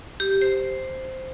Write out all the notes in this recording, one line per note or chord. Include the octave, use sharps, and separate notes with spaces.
G4
C5